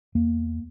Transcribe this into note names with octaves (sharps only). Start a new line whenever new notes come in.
E2 A#3